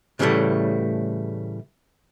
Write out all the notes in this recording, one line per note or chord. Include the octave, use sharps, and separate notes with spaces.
A2 C#3 E3 F3 G3 A3